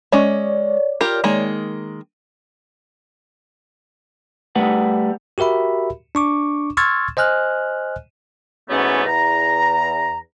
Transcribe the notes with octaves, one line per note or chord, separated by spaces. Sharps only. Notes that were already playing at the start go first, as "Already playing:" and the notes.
G#3 C#4 C#5 D5
F4 G4 A#4
D#3 G#3 A#3
G3 A3 B4 F#5
F#4 G4 A#4 E5 B5
D4 C#6 D6
C6 C#6 E6 F6 G#6 A6
C5 D#5 G#5 F6 F#6
G#2 E3 F#3 A3 B3 C#4
E2 A#5